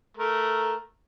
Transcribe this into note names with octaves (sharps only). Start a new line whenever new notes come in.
A3 A#4